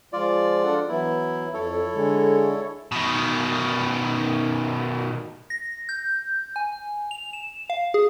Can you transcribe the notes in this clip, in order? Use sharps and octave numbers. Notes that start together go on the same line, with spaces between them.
F3 G#3 F4 D5
D4 A4 F#5
E3 F#3 B3 E4
F2 E4 A4 C#5
D3 G#3
B2 D#3
A#6
G6
G#5
F7
E7
F5
G#4